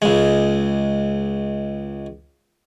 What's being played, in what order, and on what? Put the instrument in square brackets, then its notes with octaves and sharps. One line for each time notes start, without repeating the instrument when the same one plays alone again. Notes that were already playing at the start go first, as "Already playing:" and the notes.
[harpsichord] C#2 G#3